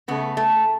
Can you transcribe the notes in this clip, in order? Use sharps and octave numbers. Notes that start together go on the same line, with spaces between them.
C#3 A3 B3
A3